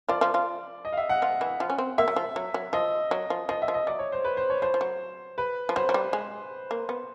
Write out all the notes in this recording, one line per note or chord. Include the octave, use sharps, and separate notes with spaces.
F3 F4 D5
F3 F4
F3 F4
D#5
F5
E5
F#5
F3 F4
E3 E4
F3 F4
C#4
C4
A#3 E5
F#3
F3
F#3
F#3
F3 D#5
F#3
F3
F3 D#5
E5
F3
D#5
F#3 D5
C#5
C5
B4
C5
C#5
F3 C5
F3
F#3
B4
F3
F#3 C5
F#3
G3
G#3
A#3
B3